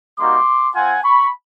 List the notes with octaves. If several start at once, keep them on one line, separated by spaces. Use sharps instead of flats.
G3 A#3 D#4 F#4 C6 D6
C4 F4 F#5 G#5
B5 C#6